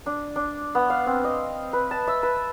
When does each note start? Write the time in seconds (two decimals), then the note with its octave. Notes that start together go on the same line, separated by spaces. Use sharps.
0.06 D4
0.36 D4
0.75 B3
0.90 F5
1.06 C4
1.24 D#5
1.73 B4
1.91 A5
2.08 E5
2.23 B4